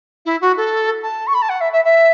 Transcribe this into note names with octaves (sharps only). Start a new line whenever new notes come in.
E4
F#4
A4
A5
C#6
B5
A5
F#5
E5
E5
E5